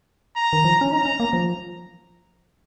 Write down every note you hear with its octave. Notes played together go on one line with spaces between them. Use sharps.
A#5
D#3
F3
C#4
D#4 A#5
C#4
A#3
F3